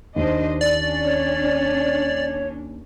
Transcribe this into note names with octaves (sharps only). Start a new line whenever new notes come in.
D#2 D4 C5 D#5
C#4 D4 D5
C#5